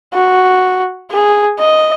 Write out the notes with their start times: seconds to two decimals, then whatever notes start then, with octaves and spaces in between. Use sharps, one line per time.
0.14 F#4
1.11 G#4
1.59 D#5